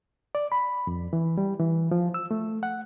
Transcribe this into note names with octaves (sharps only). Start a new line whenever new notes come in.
D5
B5
F2
E3
G3
E3
F3
E6
A3
F#5